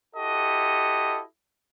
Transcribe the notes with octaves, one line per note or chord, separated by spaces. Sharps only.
E4 F#4 G4 A4 D#5